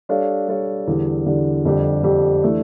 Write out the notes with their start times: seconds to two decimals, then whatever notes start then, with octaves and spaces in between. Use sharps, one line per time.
0.09 G3 D4 A4 C#5 F5
0.48 G3 D4 A4 C#5 F5
0.87 E2 D3 G3 D4
1.26 E2 D3 G3 D4
1.65 F2 D3 G3 D4 G4
2.04 F2 D3 G3 D4 G4
2.42 E3 A3 D4